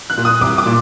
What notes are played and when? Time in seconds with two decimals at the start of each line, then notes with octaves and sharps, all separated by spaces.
0.10 F#6
0.17 A#2
0.25 D#6
0.41 C2 D6
0.58 D6
0.66 A#2